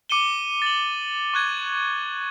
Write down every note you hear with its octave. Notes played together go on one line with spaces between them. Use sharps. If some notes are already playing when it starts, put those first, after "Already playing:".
D6 C#7 D#7 E7 G7
A6 F#7
C#6 F#6 G#6